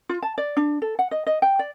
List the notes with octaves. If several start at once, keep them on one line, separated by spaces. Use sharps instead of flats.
F4
A5
D5
D4
A4
F#5
D#5
D#5
G5
D5